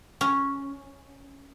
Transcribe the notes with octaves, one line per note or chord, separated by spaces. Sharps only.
C#4